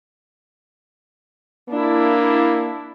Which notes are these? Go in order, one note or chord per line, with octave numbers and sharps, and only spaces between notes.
A#3 D4 E4